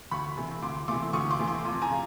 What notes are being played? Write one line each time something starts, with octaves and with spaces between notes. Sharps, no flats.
D2 B5 C#6
C3 E3 A3
D2 C6 D6
C3 E3 A3 C6 D6
D2 C#6 D#6
C6 D6
C3 E3 A3
C6 D6
F2
G#5 A#5
C#3